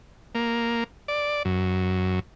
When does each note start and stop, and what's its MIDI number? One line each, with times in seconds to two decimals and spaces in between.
0.35 0.84 58
1.08 1.43 74
1.45 2.20 42